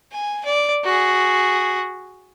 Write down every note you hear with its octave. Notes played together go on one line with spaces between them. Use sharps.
G#5
D5
F#4 G#4